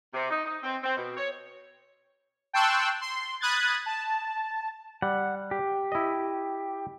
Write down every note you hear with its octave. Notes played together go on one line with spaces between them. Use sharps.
C3
D#4
D#4
C4
C4
B2
C#5
G5 A5 C6 C#6 E6 F#6
C6
B5 D#6 F#6 G#6 A6
A5
G3 F#5
G4
E4 D#5